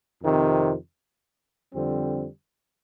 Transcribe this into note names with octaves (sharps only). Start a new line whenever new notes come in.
F2 C3 D#3
F2 D3 G3 C4